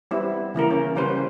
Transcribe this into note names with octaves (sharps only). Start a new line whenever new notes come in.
G3 B3 C4 E4
C#3 E3 A#3 A#4
C#4
C#3 G3 C#4 B4 C5